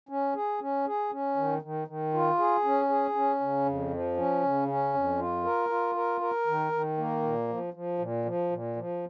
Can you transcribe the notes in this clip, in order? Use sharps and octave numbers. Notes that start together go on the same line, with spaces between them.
C#4
G#4
C#4
G#4
C#4
D#3
D#3
D#3
F4
G#4
C#4
G#4
C#4
C#3
F2
F3
C#4
C#3
C#4
F2
F4
A#4
F4
A#4
A#4
D#3
D#3
A#3
A#2
F3
F3
A#2
F3
A#2
F3